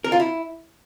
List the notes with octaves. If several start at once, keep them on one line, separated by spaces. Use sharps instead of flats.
A#4
F4
E4